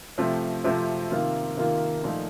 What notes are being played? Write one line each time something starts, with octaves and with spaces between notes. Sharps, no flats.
C3 F3 A3 C4
C3 F3 A3 C4
C3 D#3 A#3 F4
C3 D#3 A#3 F4
A#2 F3 A3 D#4